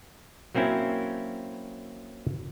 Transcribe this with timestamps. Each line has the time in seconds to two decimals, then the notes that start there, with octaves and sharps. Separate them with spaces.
0.55 F#3 A#3 C4 C#4 E4